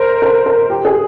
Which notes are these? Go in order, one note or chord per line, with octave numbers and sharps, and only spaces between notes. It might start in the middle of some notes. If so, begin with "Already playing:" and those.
Already playing: A#4 C5
A#4
A#4
G4
G#4